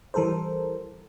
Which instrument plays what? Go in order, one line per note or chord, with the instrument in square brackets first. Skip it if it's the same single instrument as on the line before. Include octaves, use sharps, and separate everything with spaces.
[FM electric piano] E3 G3 A4 A#4 C5